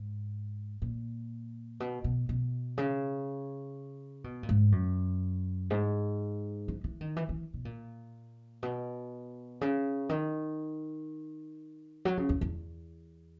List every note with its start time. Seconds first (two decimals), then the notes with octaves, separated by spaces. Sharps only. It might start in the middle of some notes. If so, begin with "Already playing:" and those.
Already playing: G#2
0.82 A#2
1.80 B2
2.04 B2
2.29 B2
2.78 C#3
4.24 B2
4.43 A#2
4.49 G#2
4.72 F#2
5.70 G#2
6.68 E3
6.84 E3
7.01 D#3
7.16 E3
7.29 E3
7.54 B2
7.65 A#2
8.63 B2
9.61 C#3
10.09 D#3
12.05 F#3
12.17 C#3
12.29 E2
12.41 E2